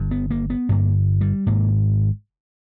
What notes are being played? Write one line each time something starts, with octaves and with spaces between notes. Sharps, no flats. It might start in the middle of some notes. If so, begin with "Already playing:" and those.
Already playing: G1 G2
B3
A#3
B3
G1 G2 A#3
G3
G#1 G#2 A#3